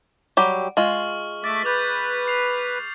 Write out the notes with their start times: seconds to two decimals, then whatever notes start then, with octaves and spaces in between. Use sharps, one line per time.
0.37 F#3 G3 G4
0.77 G#3 F4 C#6 F6 F#7
1.44 A3 E5 D6 A6
1.65 B4 D6 G6 A6
2.28 C7 F7